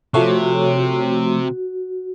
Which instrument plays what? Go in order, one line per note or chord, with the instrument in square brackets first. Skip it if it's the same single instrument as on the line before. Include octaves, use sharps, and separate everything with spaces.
[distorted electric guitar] C3 [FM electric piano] F3 A3 C#5 [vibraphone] F#4